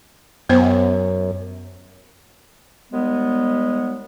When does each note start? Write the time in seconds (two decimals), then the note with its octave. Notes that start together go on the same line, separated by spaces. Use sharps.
0.49 F#2 B3 C5
2.92 D#2 G3 G#3 B3